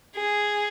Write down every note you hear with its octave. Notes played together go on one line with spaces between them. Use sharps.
G#4